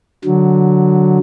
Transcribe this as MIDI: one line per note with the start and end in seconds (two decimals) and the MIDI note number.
0.25 1.18 50
0.25 1.18 54